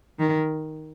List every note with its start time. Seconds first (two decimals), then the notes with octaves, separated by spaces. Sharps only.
0.19 D#3